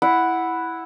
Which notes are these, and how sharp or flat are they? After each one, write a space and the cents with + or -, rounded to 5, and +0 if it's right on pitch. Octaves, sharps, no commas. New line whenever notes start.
E4 +0 F#5 +0